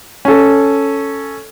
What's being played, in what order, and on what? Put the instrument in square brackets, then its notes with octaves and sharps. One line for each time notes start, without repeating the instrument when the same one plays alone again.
[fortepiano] C#4 A4